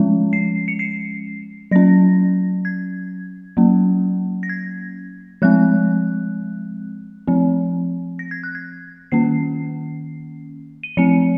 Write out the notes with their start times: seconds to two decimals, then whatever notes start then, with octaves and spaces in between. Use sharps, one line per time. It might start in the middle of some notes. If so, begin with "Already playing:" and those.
Already playing: F3 G#3 C#4
0.33 C7
0.68 C#7
0.79 C7
1.71 F#3 C#4 A#6
2.65 G#6
3.57 F#3 A#3 C#4
4.43 A#6
4.49 G#6
5.42 F3 G#3 C4 F#6
7.28 F3 C4
8.19 A#6
8.31 G#6
8.43 F#6
8.55 G#6
9.12 D#3 A#3 C#4 C7
10.83 D#7
10.97 F3 C4 C#7